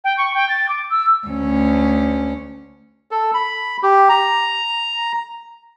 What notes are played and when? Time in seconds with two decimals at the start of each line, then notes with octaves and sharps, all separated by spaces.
0.04 G5
0.17 C#6
0.34 G5
0.49 A6
0.69 D6
0.90 E6
1.28 D2 C#4
3.11 A4
3.34 B5
3.83 G4
4.09 A#5